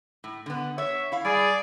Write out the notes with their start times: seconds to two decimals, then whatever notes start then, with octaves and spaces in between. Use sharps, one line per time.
0.24 A2
0.46 D3 B3
0.78 C#5 E5
1.12 E4 F5
1.25 G3 G#4 D5